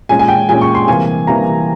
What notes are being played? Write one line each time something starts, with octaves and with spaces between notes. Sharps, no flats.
A#2 G#3 C#4 G#5
G#5
G5
A#2 G#3 C#4 G#5
C#6
C6
C3 E3 G3 A#3 G#5
C3 E3 G3 A#3 A#5